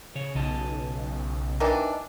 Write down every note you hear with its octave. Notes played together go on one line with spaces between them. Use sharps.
C#3 C#5
B1 C#3 D#5 A5
D#3 E3 D4